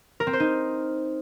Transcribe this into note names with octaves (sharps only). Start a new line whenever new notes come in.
A#4
C4
C5
D#4